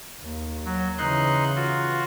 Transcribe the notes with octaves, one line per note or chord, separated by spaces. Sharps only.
D#2
F#3
C#3 E3 D#4 C6 F#6
F4 F#4